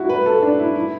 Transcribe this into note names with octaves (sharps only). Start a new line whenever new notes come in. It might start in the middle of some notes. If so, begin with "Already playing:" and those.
Already playing: E4 F#4
B4
A4
D4
E4
E4